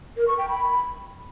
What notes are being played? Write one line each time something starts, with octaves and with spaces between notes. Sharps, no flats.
A#4
C#6
G5
B5